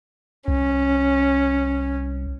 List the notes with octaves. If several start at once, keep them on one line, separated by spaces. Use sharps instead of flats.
C2 C#4